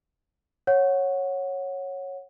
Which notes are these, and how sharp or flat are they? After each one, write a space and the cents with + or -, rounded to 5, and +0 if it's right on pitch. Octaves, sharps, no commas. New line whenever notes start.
C#5 -10 F#5 -5